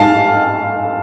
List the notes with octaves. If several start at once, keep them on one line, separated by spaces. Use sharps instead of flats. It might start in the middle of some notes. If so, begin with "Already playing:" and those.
Already playing: F5 A5